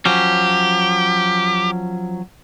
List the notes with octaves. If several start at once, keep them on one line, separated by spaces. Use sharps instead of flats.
F3 F#3 C#4 G4